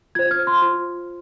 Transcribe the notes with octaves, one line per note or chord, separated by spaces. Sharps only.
F4 C5 G#6
F6
C6
F4 C5